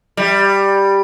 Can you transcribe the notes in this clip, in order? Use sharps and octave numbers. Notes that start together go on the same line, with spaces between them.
G3